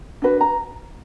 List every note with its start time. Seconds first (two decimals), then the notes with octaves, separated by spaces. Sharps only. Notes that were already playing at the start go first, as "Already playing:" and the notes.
0.22 D4 F#4 B4
0.41 A#5